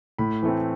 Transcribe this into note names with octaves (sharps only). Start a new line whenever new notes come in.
A2 B5
E3 A3 C4